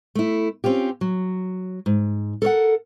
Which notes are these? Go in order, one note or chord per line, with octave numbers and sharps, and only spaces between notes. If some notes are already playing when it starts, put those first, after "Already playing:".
A3 E4
C4 C#4 F4 G4
F#3
G#2
A4 A#4 C#5 F#5